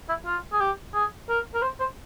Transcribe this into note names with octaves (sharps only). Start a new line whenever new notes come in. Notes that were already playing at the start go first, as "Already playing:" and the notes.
E4
F4
G#4
G4
G#4
A#4
A#4
C5
C5